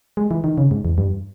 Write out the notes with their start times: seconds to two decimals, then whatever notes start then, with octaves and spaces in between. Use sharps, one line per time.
0.17 G#3
0.31 E3
0.44 D#3
0.58 C#3
0.71 G#2
0.85 E2
0.98 G2